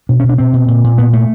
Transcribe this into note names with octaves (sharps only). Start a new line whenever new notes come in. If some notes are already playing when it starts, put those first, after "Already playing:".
B2 D4
B2 C#4
D4
B2 C4
B2
A#2
A#2
A#2 B3
A#2 A3